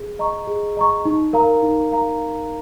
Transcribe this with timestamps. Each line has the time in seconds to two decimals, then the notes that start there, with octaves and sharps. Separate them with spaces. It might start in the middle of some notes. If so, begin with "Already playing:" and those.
Already playing: G#4
0.19 D#5 A#5 C#6
0.47 G#4
0.77 D#5 A#5 C#6
1.05 D#4
1.33 A#4 F5 A#5
1.63 D#4
1.91 A#4 F5 A#5